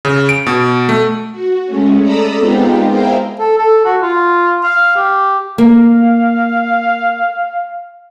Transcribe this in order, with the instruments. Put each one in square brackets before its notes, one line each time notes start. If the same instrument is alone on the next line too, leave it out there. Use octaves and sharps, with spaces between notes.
[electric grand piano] C#3
D7
B2
A3
[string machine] F#4
G#3 A3 C#4
A4 D5 A#5 B5 D#6 E6
G#3 B3 C4 D#4 F4 G4
E4 G#4 A#4 C5 F5 G5
[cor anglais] A4
A4
F#4
F4
F5
G4
[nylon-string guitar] A#3 [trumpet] F5